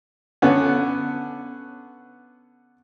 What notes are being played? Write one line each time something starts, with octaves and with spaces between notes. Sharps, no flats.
D3 B3 C#4